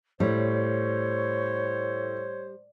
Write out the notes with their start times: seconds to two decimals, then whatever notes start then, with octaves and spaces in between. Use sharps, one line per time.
0.20 A2 G3 C5 C#5